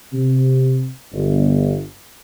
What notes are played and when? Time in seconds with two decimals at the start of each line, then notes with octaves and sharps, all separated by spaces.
0.13 C3
1.13 G1